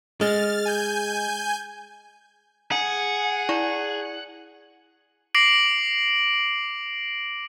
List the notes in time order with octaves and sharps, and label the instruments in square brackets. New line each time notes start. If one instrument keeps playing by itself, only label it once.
[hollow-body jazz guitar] G#3 [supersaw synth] F6 A6
[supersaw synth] G#5 G6
[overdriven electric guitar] G#4 [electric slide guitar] F#5
[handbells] E4 D5 C#6
[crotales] D6 A#6 C7 D7 F#7